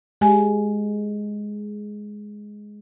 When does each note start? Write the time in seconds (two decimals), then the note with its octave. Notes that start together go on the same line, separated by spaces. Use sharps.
0.21 G#3 G4 G#5